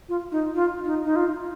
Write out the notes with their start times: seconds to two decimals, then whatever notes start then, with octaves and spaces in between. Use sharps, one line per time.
0.09 F4
0.32 D#4
0.55 F4
0.85 D#4
1.04 D#4
1.16 F4